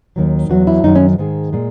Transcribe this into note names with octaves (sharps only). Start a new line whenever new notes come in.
D#2 D#3 F#3
E2 D#3 F#3 F#4
E4
F#2 D#3 F#3 D#4
C#4
G#2 D#3 G#3
A#2 G#3